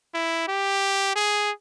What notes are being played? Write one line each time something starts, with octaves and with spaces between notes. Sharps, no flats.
E4
G4
G#4